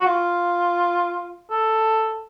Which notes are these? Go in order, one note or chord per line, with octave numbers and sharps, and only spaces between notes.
F#4
F4
A4